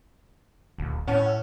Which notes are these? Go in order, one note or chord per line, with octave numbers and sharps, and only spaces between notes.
D#1 D2
A2 C#4 F#5 A5
F#5 E6